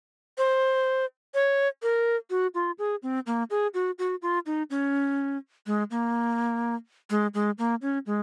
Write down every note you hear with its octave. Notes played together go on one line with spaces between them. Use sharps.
C5
C#5
A#4
F#4
F4
G#4
C4
A#3
G#4
F#4
F#4
F4
D#4
C#4
G#3
A#3
G#3
G#3
A#3
C#4
G#3